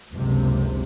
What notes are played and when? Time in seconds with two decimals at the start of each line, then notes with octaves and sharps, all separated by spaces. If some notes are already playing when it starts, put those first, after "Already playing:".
0.12 F#1 C#2 G2 C3